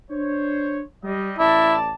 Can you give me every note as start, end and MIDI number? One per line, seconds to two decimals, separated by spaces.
0.11 0.80 62
0.11 0.80 72
0.11 0.80 73
1.04 1.34 55
1.04 1.34 75
1.38 1.93 33
1.38 1.76 64
1.38 1.93 74
1.38 1.93 81